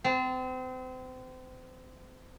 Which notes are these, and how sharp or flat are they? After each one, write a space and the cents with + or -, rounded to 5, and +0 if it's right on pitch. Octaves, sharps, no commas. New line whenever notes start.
C4 -35 A5 +0